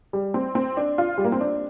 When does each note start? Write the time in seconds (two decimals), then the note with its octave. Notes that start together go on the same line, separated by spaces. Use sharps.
0.13 G3
0.34 C4
0.55 C4
0.77 D4
0.98 F4
1.18 G3
1.25 A#3
1.32 C4
1.41 D4